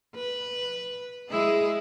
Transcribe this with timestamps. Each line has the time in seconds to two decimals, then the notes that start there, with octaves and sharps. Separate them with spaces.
0.15 B4
1.29 G#3 E4 G#4